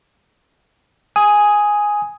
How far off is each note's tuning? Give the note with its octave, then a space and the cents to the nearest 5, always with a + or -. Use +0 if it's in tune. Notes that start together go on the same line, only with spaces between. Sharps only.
G#5 +0 D#6 +10